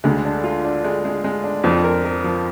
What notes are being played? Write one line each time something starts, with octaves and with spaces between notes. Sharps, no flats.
D2 D3 G#3
D4
F4
D4
G#3
G#3
G#3
D4
F2 F3 C4
A#4
A#4
F3